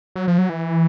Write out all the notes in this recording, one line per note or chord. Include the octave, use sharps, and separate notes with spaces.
F#3
F3
F#3
E3